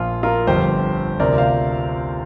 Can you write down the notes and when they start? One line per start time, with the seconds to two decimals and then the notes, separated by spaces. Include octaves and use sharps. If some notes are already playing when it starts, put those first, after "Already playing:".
Already playing: A#1 A#2 F3 F4
0.23 F4 A#4
0.47 G1 F2 D3 G4 C5
1.20 D2 C3 F3 A#4 D5
1.38 C5 F5